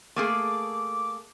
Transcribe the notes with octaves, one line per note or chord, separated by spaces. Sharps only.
A3 A#3 G#4 D6